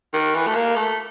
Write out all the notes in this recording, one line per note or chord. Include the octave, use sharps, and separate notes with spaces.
D#3
E3
A3
A#3
A3